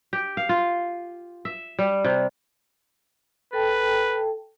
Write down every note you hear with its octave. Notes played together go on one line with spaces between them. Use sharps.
G4
F5
F4
E5
G3
C3
A4 B4 G5 A5